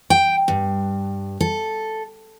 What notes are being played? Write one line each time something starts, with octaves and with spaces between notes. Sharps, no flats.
G5
G2
A4